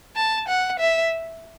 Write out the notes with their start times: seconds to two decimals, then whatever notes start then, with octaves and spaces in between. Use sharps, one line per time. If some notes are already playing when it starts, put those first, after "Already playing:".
0.16 A5
0.48 F#5
0.79 E5